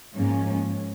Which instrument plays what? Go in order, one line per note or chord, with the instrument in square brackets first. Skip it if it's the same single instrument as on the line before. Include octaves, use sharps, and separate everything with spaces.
[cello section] G#2 F3 A#3 C#4